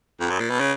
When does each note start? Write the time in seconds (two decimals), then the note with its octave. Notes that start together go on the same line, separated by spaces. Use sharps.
0.20 F2
0.30 F#2
0.40 A#2
0.50 B2
0.60 C#3